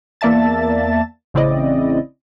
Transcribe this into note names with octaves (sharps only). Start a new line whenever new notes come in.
E2 A#3 D5 E5 A5 A6
A1 C#3 C4 E4 D5 D#5